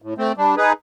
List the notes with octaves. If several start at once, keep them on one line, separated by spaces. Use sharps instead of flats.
A2
A3 C4
G3 D4
D#4 G#4 B4